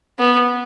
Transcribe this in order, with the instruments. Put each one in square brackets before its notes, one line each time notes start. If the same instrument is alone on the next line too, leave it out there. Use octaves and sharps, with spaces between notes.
[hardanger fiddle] B3